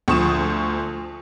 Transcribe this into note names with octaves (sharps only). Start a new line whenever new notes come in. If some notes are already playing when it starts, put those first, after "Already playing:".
D2 F3 C#6 D#6 E7